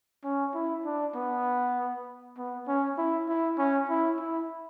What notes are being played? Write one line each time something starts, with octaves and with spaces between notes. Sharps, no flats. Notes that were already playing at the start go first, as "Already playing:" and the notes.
C#4
E4
D4
B3
B3
C#4
E4
E4
C#4
E4
E4